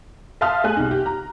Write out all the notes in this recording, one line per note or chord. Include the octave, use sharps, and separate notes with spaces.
E5 F5 A5 C6 D#6 F6
A3 G#4 G#5 F#6
C2 D#4
G4
A#5